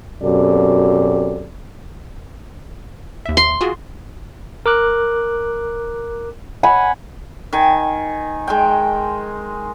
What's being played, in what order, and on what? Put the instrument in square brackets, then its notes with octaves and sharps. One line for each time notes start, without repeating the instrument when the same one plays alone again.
[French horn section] F#2 B2 C4 G4 A4 D5
[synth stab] D#2 E5
[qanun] C6
[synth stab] F4 F#4 G#4
[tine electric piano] A#4 D6 F#6
[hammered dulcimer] F#5 G#5 B5
D#3 G#5
G#3 A#4 G5